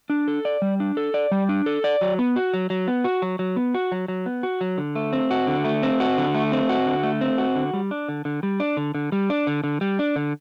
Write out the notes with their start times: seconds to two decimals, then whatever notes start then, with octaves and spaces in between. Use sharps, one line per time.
0.10 D4
0.28 A4
0.45 D5
0.62 G3
0.80 D4
0.97 A4
1.14 D5
1.32 G3
1.49 D4
1.66 A4
1.84 D5
2.01 F#3
2.19 B3
2.36 F#4
2.54 F#3
2.70 F#3
2.88 B3
3.04 F#4
3.22 F#3
3.39 F#3
3.56 B3
3.74 F#4
3.92 F#3
4.08 F#3
4.26 B3
4.43 F#4
4.61 F#3
4.78 D3
4.95 A3
5.13 C4
5.31 F#4
5.47 D3
5.65 A3
5.83 C4
6.00 F#4
6.18 D3
6.35 A3
6.52 C4
6.69 F#4
6.86 D3
7.03 A3
7.21 C4
7.38 F#4
7.55 D3
7.74 G3
7.91 D4
8.08 D3
8.25 D3
8.43 G3
8.60 D4
8.77 D3
8.95 D3
9.12 G3
9.30 D4
9.47 D3
9.64 D3
9.81 G3
9.99 D4
10.16 D3